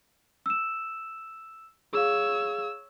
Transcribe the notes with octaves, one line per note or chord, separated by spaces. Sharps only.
E6 E7
G#4 C#5 F5 E6